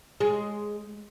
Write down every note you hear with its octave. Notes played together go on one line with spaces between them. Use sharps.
G#3